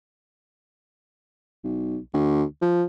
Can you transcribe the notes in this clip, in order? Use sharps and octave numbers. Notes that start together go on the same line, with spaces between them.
B1
D2
F3